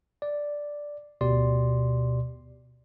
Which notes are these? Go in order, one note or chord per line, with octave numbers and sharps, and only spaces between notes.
D5
D2 B2 G4 D5 C6